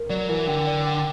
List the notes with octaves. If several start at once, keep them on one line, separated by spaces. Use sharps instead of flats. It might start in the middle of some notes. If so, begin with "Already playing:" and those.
Already playing: A#4
F#3 D5
E3 A#4
D3 G5
D5
G5